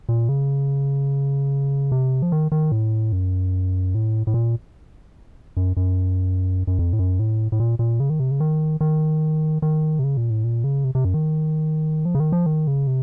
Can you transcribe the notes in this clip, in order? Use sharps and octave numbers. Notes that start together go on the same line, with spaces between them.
A#2
C#3
C3
F3
D#3
D#3
A2
F#2
A2
A2
A#2
F#2
F#2
F#2
F2
A2
F#2
A2
A2
A#2
A#2
C#3
D#3
C3
C#3
D#3
D#3
D#3
C3
C#3
A#2
A2
A#2
C#3
C3
C3
F#2
D#3
F3
C#3
D#3
F3
D#3
C#3
C3